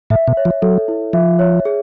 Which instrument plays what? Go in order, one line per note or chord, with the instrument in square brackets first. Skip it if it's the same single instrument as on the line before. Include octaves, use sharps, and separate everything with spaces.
[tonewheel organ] A2 [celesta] E5
[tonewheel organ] B2
[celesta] C#5
[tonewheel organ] F3
[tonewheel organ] F#3 [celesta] A4
[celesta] E4
[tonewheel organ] F3 [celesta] E5
[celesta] C#5
G#4